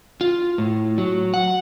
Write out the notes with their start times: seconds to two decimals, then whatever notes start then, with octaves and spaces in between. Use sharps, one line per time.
0.21 F4
0.58 A2
0.98 F#3
1.34 F#5